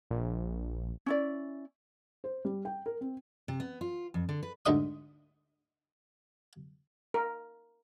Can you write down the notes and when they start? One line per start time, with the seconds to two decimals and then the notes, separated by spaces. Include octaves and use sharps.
0.11 A#1
1.06 C#4 E4 D5
2.24 C5
2.45 G3
2.65 G5
2.86 A#4
3.01 C4
3.48 C3
3.60 B3
3.81 F4
4.14 F2
4.29 D3
4.43 B4
4.66 D2 G#2 D3 D#5 E5 D#6
7.14 A#4